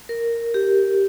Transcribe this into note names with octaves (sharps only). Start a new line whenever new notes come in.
A#4
G4